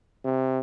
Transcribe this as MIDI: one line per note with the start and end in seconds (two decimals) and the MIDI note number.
0.25 0.60 48